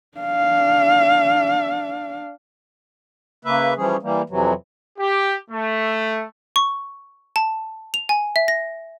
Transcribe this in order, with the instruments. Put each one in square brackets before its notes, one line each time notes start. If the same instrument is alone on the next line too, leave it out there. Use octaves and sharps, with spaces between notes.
[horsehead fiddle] D4 F5
[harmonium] C#3 A#3 B4 E5
E3 F3 G3 C#4 G#4
E3 G3 A#3
F2 C3 E3 F#3
[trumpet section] G4
A3
[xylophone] C#6
A5
F7
G#5
E5
A#6